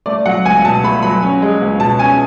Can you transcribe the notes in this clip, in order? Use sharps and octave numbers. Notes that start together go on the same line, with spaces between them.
A3 D5
F#3 F#5
C#2 G#5
B2 A5
A3 B5
F#3 B5
C#4
G#3
C#2
B2 A5
C#4 G#5